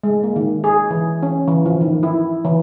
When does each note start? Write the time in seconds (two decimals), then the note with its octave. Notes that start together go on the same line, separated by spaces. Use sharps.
0.04 G#3
0.23 A#3
0.36 D#3
0.64 G#4
0.90 E3
1.23 C#4
1.48 E3
1.66 F3
1.81 D#3
2.03 E4
2.45 E3